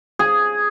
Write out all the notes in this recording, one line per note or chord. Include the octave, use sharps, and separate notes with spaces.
G#4